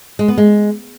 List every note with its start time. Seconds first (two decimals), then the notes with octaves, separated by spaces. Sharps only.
0.19 G#3
0.28 B3
0.38 G#3